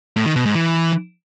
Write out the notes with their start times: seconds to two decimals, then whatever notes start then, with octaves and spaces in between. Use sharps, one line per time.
0.16 A2
0.26 D#3
0.36 B2
0.45 G#2
0.55 E3